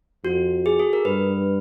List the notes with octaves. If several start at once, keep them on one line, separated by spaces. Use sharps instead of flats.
F2 F#4
G#4
A4
A#4
G2 B4